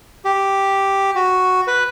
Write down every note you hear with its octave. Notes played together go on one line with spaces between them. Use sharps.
G4
F#4
B4